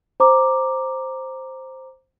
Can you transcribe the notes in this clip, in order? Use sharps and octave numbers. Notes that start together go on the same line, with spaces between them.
C5 A#5 D6